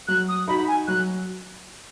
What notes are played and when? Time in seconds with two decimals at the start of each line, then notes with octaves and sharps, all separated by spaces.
0.07 F#3 F#6
0.28 D#6
0.48 D#4 F#4 B5
0.68 G#5
0.87 F#3 F#6